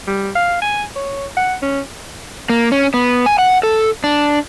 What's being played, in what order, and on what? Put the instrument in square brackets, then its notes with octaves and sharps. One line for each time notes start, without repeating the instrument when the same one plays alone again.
[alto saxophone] G3
F5
G#5
C#5
F#5
C#4
[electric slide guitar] A#3
C#4
B3
G#5
F#5
A4
D4